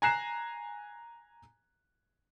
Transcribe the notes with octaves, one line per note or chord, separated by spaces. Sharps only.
G#5 A#5 F#6 C7 E7